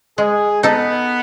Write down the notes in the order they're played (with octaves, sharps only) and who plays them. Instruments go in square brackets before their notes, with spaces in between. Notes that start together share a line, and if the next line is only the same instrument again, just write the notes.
[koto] G#3 [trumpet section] G#4
[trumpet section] B3 [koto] D#4 A4